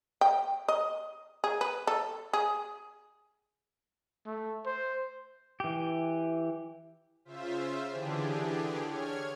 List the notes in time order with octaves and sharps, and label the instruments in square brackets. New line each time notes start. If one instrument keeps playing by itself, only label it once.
[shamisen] G5
D#5
G#4
B4
A4
G#4
[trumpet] A3
C5
[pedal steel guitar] E3 G4
[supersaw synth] C#3 F4 C5 E5
D3 E3 D4 G4 G#4
C#5 F6 G#6